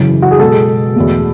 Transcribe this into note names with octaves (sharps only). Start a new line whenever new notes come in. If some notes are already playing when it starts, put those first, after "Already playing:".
Already playing: F#2 C#3 E3
F#4
G#4
B2 G#3 A4
E2 B2 A3